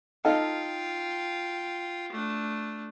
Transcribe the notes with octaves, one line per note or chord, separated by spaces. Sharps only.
D#4 F4 A4 F5 G5
A3 D4